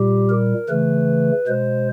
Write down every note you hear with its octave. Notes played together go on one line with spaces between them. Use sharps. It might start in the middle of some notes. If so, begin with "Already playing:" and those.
Already playing: A#2 G3 G4
A#4
C#3 E3 A3 B4
B2 G#3 C5